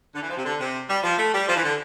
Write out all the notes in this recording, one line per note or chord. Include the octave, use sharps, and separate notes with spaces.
D3
E3
F3
C3
D3
C3
G3
F3
A3
G3
F3
E3
D3